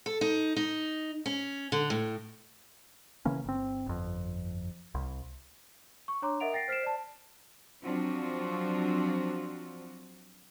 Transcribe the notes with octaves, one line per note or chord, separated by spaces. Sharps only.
A4
D#4
D#4
C#4
D3
A2
C#3 E3 A#3 C#4
G1 C4
G1 F2
C2
C#6
D4 C#5 A#5 C6 D6
A#4 D#5 E5 F#5 D7 F7
G5 A6 A#6 C7 D7
C5 F6 B6 C7 D7 E7
D5 A5
F3 F#3 C4 D4 F4 F#4